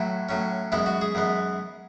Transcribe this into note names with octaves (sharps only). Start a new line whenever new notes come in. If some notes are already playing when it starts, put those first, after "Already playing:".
Already playing: A2 F#3 E4
A2 F#3 C#4
F#2 E3 G#3 B3 E4
F#4
G#4
F#2 E3 G#3 B3